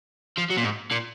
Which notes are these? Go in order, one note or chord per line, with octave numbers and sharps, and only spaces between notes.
F3
F#3
A#2
G#2
A#2